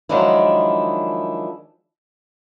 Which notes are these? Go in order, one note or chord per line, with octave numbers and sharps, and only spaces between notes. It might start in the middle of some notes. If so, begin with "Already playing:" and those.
D#3 F3 F#3 G#3 D4 E4